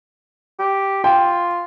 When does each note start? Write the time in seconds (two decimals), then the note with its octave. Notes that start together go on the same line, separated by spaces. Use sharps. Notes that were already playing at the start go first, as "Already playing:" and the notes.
0.59 G4
1.04 F4 G5